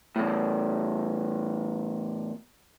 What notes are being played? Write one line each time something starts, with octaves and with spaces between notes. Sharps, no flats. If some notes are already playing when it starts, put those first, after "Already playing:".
E2 A2